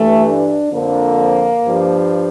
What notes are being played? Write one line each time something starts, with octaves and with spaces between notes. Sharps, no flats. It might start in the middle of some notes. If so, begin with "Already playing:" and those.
Already playing: G2 E3 A3
D4
F2 D3 F3 A#3
G2 F3